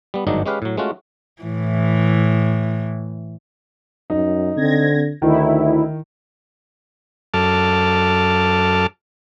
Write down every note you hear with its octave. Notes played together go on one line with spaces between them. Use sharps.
G3 B3
G1 G#2 D#3 F#3 D4 D#4
G#3 C#4 G4 B4 F5
A2 F#3
G#3 A3 C#4 F4 F#4
A2 E3
F#2 D#4
D3 C4 G#6 A#6
D2 D#3 D#4 E4
F#2 A4 A5 D6 F6